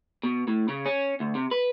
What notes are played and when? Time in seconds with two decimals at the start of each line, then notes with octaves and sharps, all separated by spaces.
0.23 B2
0.48 A2
0.68 C#3
0.86 C#4
1.20 D2
1.35 C3
1.51 B4